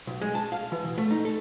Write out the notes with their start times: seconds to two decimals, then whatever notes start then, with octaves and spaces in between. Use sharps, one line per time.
0.07 B1
0.21 G#3
0.35 A5
0.52 F5
0.72 E3
0.85 B2
0.98 A3
1.11 D#4
1.25 A4